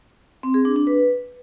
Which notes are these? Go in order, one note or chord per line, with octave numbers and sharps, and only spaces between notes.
C4
G#4
D4
D4
B4